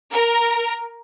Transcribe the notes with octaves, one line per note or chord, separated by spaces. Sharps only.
A#4